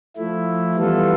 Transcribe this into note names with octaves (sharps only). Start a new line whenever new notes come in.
F3 A3 E4
E3 G3 B3 F4 A4